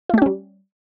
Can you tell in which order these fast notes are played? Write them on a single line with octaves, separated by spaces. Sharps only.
F4 A3 G4 C#4 G3